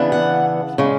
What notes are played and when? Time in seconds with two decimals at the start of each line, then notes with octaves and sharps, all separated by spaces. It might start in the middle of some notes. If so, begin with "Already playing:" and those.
Already playing: C#3 E3 B3 D4
0.12 F#5
0.78 C#3 G#3